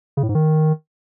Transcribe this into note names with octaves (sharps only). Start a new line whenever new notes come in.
C#3
A2
G#2
D#3